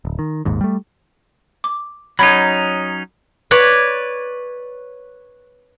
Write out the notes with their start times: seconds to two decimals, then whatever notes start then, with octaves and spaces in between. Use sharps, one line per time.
0.05 D1
0.19 D#3
0.45 D#1 G#1 D#2 G#2
0.61 G3 A3
1.64 D6
2.19 F#3 C#4 D#4 B5 G#6
3.51 B4 C#5 D5